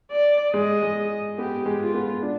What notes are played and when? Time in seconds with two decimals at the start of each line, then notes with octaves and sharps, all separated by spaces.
0.11 D5
0.54 G#3 D#5
0.82 G#3
1.38 B3 G4
1.66 G#3
1.81 F4
1.94 B3
2.22 D4